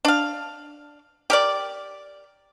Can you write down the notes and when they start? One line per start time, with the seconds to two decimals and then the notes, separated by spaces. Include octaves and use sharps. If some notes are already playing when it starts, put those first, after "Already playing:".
0.05 D4 F5
1.30 G4 A#4 D5